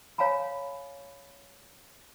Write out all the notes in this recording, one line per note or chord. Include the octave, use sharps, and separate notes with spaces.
C#5 F5 G#5 A#5 B5